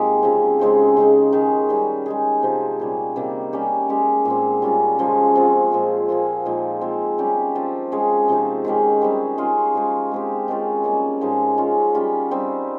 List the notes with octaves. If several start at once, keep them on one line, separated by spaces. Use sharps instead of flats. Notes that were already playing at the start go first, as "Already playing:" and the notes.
Already playing: C3 G#3 A#3 D#4 F4 G4
C#3 F3 C4
C#3 G#3 C4 D#4
C#3 G#3 D#4
D#3 G#3 C#4
D#3 G3 C#4
G#3 D#4 G#4
C3 F3 C4
A#2 G3 C#4
C3 D#3 A#3
G3 C#4 G4
G#3 C#4 G4
A#2 G#3 C4
G3 C#4 F4
C#3 F3 G#3
F3 C4 F4 G#4
A#2 G#3 C4
F3 A#3 F4 G#4
A#2 F3 G#3 D#4
F3 G#3 C4
G3 C#4 G4
F3 C4 F4
G#3 C#4 G#4
C3 F3 C4 D#4
D#3 G#3 C#4 G4
G3 C4 D#4 G#4
G#3 C#4 F4 G#4
F3 G#3 D#4
G#3 C4 G4
D#3 G#3 C#4 F4
G3 A#3 C#4
A#2 F3 G#3 D#4
G#3 C#4 F4
G3 C#4 F4
G3 C4 D#4